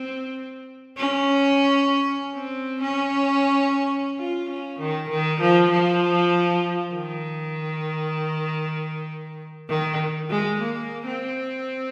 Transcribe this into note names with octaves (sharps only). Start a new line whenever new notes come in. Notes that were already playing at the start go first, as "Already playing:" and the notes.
Already playing: C4
C#4
C4
C#4
F4
C#4
D#3
D#3
F3
F3
D#3
D#3
G#3
A#3
C4